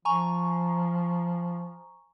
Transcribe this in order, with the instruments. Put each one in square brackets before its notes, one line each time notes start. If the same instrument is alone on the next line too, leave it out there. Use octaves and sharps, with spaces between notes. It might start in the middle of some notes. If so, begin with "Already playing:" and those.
[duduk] F3 [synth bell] G#5 A#5 C#6